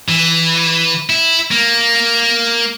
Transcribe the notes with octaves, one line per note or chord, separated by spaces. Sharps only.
E3
E4
A#3